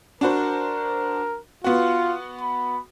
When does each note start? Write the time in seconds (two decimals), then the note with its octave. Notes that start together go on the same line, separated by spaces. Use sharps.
0.21 D4 F#4 A#4 C5
1.64 B3 F4 F#4
2.41 B5